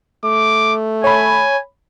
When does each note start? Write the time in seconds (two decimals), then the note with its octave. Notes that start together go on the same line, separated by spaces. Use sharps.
0.25 A3 D6
1.04 C#5 G#5 B5